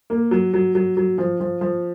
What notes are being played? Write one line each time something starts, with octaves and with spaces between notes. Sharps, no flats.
A#3
F#3
F#3
F#3
F#3
F3
F3
F3